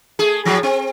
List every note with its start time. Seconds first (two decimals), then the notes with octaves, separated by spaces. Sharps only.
0.19 A3 G#4
0.45 A2 F3 F#3
0.63 C4